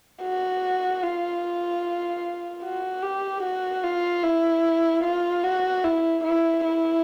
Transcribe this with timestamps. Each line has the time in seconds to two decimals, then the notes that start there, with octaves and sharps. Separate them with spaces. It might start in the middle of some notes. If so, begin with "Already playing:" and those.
0.23 F#4
1.03 F4
2.63 F#4
3.03 G4
3.43 F#4
3.83 F4
4.24 E4
5.04 F4
5.43 F#4
5.84 E4
6.24 E4
6.64 E4